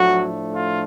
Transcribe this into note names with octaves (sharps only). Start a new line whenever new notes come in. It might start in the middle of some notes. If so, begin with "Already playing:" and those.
Already playing: A2 F3 F#3 A3 D4 F#4
F4